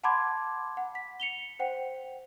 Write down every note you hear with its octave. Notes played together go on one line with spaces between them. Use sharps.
F#5 A5 B5 C6 D6 G#6
F#5
B6
C#7 F7 G7
C5 F#5 G5